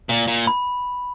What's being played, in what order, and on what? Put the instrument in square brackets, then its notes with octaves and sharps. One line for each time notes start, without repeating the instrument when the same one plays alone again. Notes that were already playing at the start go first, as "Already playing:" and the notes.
[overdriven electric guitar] A#2
A#2
[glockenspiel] B5